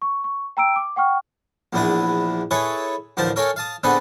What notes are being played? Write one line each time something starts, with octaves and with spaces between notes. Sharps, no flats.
C#6
C#6
G5 A#5 E6 D7
D6
F#5 G5 C#6 F6
A#1 E2 E3 D4 E4 D#6
E4 G#4 A4 B4 C#5
A1 D2 F3 A#4 C5 A5
A4 A#4 C#5 F5 G5 G#5
F5 A5 D#6
D3 B3 C4 G#4 A4 B4